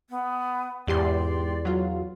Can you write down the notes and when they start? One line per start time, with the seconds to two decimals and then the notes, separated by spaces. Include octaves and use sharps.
0.10 B3
0.87 E2 G#2 G4 D5 C6
1.65 F#3 F4